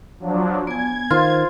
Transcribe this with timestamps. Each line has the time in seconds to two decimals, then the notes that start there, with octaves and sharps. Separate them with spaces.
0.20 F3 F#3 D4
0.67 B3 G#5 G#6
1.11 D#3 F4 C5 C6